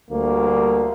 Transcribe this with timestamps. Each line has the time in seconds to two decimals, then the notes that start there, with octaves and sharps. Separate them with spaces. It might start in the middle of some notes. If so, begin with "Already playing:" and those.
0.11 D2 G3 A#3